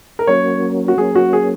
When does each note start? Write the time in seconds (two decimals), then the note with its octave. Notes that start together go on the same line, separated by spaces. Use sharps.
0.19 A#4
0.27 F#3 A#3 C#4 C#5
0.88 F#4
0.97 F#3 A#3 C#4 G#4
1.15 F#4
1.33 G#4